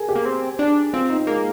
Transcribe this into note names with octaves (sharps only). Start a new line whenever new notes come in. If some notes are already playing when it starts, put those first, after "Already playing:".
Already playing: G#4 A#4
G4
A#3
C4
D4
C4 F4
D#4
G#3 A#3